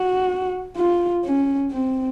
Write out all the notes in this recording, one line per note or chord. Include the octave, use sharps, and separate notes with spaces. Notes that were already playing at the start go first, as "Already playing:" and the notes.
Already playing: F#4
F4
C#4
C4